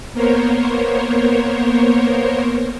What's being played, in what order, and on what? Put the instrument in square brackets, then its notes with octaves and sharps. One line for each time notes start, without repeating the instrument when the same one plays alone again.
[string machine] A#3 B3 A#4 C5 C#5